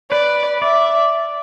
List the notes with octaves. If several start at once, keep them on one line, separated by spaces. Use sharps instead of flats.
B4 D5
D5 E5